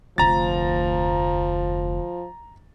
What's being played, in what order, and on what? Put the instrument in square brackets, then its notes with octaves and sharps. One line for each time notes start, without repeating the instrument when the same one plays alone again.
[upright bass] F1 D2 [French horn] F3 [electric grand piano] A#5 A6